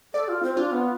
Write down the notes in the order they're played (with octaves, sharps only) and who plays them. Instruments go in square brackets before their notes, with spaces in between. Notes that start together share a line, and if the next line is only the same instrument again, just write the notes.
[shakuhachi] A4 [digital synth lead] D5
[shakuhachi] F4
C4
[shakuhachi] D4 [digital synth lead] F4
[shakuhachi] B3